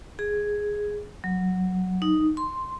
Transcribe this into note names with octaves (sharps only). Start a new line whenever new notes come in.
G#4
F#3
D#4
C6